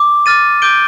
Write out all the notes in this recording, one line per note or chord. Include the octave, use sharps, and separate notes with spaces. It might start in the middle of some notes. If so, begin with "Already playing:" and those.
Already playing: D6
D6 F6 A6 D#7
D6 G6 D7 G7